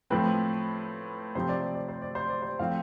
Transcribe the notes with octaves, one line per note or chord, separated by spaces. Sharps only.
A2 F3 C4 B4
C3 F3 C4 C5
D5
C5
D5
C5
D5
C5
D5
C5
A2 F3 C4 F5